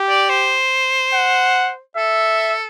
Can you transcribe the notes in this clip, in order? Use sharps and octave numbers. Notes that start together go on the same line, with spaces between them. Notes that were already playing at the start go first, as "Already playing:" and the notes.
Already playing: G4
D5
C5
F#5
A4 E5